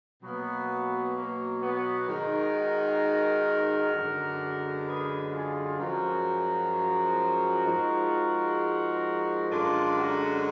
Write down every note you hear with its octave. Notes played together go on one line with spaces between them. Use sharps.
B2 F#3 A#3 B3
A#3
B3
G#2 D#3 G#3 F#4 A#4
F#2 D3 G#3
G#4 B4
F4 G#4
F#2 F3 G#3 F#4 A#4
G#2 F3 G#3
F#2 D3 G#3 D4 F4
F#4 A#4